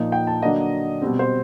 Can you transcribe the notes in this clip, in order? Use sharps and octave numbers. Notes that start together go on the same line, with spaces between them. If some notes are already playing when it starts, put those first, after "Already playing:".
Already playing: A#2 F3 A#3 D#4
G5
A5
D3 F#3 A#3 D4 D#5
B2 G3 C4
C5